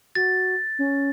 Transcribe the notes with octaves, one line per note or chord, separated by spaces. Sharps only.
F#4 A6
C#4